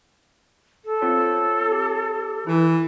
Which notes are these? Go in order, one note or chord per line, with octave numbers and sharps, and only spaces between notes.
A4
C4 F4 C#5
G4
E3 E4